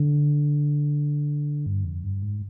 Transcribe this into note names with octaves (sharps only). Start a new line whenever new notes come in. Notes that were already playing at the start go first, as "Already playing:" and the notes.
Already playing: D3
G2
F2
G2
G#2